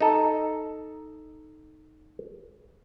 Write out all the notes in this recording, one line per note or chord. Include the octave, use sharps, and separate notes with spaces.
D#4 A4